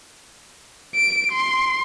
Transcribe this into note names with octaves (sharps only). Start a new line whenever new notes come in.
D7
C6